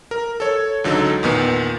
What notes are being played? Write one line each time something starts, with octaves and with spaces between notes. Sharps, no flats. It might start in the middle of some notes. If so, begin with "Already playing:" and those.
A#4
A4 C#5
C#2 D3 F#3 D#4 A4
E2 A#2 D#3 B3